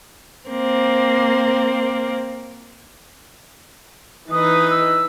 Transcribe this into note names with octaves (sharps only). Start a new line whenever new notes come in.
A#3 C4
E3 D#4 B4 D#6
E6